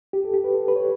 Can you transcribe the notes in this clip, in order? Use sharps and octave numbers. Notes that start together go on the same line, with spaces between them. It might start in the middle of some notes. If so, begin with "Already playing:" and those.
G4
A4
G4
B4
A4
B4
C#5